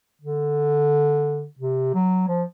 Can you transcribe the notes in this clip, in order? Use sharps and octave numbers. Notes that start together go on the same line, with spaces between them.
D3
C3
F#3
F3